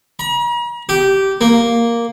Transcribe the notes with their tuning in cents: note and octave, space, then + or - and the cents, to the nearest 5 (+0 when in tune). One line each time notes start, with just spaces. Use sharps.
A#5 +45
G4 -15
A#3 +0